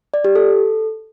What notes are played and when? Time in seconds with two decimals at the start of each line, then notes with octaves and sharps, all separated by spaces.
0.14 D5
0.25 G4
0.35 A4